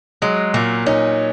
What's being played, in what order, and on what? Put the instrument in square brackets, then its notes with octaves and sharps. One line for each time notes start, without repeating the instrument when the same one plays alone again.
[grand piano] F#3 [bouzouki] G#3
[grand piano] A#2 [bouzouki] A#3
[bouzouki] C#4 [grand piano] D#4